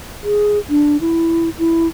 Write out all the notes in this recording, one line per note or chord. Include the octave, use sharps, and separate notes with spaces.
G#4
D4
E4
E4